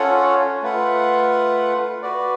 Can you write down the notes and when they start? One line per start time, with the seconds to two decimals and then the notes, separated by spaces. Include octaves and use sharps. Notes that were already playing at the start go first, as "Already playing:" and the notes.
Already playing: C#4 F4 A4 C#5 F#5
0.62 A3 F4 B4 F#5
2.02 F#4 B4 D5